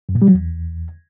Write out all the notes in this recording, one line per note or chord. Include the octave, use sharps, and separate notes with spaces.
F#2
A#2
G3
F#3
E2